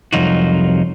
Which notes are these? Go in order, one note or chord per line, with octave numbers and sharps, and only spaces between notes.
C2 F2 F#3 D#4 F4 F#4